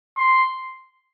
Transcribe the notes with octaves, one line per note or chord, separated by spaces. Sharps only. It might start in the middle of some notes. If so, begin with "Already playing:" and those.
C6